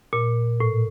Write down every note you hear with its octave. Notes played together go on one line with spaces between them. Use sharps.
A#2
A2